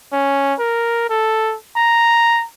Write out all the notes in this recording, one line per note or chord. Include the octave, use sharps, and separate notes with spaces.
C#4
A#4
A4
A#5